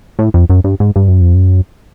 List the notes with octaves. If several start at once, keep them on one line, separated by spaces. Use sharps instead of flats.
A2
F2
F#2
G2
G#2
G2
F#2
F2
F#2